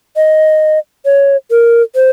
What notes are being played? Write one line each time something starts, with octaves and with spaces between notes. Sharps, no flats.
D#5
C#5
A#4
C5